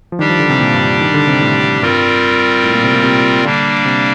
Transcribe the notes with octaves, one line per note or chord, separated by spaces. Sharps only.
F3
D#3 G3 D4 G4
F3
D3
C3
A#2
G2
D#3
D3
C3
A2
G2 G3 C4 F4 A#4
A2
A#2
C3
A#2
C3
D3 G3 A#3 D4
C3